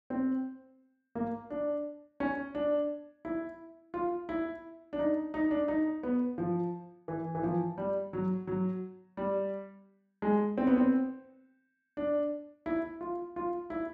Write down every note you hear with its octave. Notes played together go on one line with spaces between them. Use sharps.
C4
A#3
D4
C#4
D4
E4
F4
E4
D4
D#4
D#4
D4
D#4
B3
F3
E3
E3
F3
G3
F#3
F#3
G3
G#3
C4
B3
C4
D4
E4
F4
F4
E4